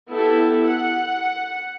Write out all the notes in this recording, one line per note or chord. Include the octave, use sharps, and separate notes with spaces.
B3 E4 G4 A4
F#5